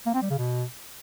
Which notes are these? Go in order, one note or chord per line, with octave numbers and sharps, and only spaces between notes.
A#3
C4
G3
C#3
B2